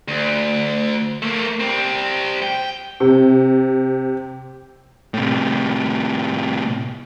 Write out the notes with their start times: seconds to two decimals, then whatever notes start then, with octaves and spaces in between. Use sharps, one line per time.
0.08 D2
1.22 A3 A#3
1.60 G3 C4
2.42 G5
3.00 C3
5.14 A2 C3